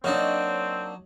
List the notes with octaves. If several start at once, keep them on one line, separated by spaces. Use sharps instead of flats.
F#3 A#3 C4 D4 D#4 C#5 D#5